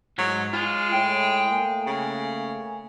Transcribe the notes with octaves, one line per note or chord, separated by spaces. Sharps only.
G#2 F#3
G#3 F4
A2 G5
A3 A#3 G#5
C#3